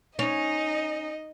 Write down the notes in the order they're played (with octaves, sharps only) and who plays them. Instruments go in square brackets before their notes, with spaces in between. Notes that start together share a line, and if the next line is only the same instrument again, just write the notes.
[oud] C#4 [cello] D#4 [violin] D#5